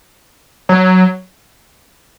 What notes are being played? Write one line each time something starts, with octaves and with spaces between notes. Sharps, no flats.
F#3